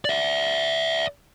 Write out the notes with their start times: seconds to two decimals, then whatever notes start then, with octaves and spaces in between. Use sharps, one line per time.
0.05 D5 E5